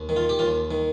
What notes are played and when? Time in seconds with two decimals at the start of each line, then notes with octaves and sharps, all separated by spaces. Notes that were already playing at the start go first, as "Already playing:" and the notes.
Already playing: D#2
0.09 D#3
0.16 F4
0.29 G4
0.39 D#2 F4
0.71 D#3